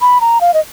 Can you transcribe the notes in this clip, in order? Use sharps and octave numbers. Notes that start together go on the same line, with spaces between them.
B5
A#5
F5
D#5